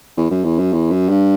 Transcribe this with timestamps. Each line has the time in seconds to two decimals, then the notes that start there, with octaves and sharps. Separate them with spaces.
0.17 E2
0.31 F#2
0.44 E2
0.58 F#2
0.73 E2
0.91 F#2
1.09 G2